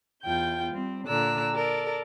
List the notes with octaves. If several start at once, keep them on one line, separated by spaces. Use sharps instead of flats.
E2 F4 G5 G6
G3 C4
A#2 D3 D5 A#5 E6 F#6
A4 A#4 D5